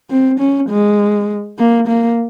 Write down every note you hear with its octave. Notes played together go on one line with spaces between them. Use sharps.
C4
C#4
G#3
A#3
A#3